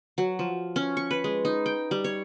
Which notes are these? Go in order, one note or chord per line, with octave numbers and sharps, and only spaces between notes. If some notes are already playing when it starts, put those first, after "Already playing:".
F#3
F3
C#4
C#6
B4
G#3
D#4
G5
G3
C#5